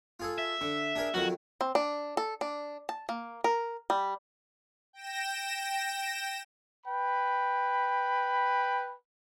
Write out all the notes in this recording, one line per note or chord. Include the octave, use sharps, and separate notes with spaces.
F4 G#4 A4
E5
D3
D4 G#4 A#4
F2 D#3 F#3 F#4
C4
D4
A4
D4
A5
A#3
A#4
G3
G5 A#6 E7
B4 G5 B5